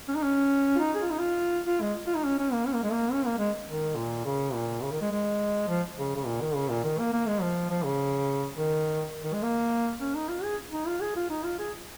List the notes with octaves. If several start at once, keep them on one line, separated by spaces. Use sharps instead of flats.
C#4
D#4
C#4
F4
D#4
G#4
F4
D#4
F4
F4
G#3
F4
D#4
C#4
C#4
A#3
C#4
A#3
G#3
A#3
C#4
A#3
G#3
D#3
A#2
C#3
A#2
C#3
D#3
G#3
G#3
F3
C#3
C#3
A#2
D#3
C#3
A#2
D#3
A#3
A#3
G#3
F3
F3
C#3
D#3
D#3
G#3
A#3
C#4
D#4
F4
G#4
D#4
F4
G#4
F4
D#4
F4
G#4